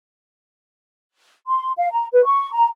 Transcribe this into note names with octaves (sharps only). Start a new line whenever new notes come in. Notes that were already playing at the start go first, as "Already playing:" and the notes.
C6
F5
A#5
B4
C#6
A#5